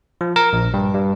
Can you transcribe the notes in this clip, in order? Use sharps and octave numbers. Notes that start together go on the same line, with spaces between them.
F3
A#4
A#1
G2
G2